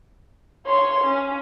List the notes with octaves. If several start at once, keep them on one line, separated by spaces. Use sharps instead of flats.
C#5 C6
C#4